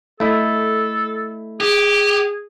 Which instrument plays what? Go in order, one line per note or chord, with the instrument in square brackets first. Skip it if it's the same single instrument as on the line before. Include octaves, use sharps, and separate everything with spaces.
[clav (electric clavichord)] A3 E4 D#5 [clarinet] A4
[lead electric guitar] G4 [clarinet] G#4